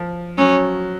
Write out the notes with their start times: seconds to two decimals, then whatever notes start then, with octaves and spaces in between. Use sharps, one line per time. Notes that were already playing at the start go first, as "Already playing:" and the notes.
Already playing: F3
0.38 F#3 C#4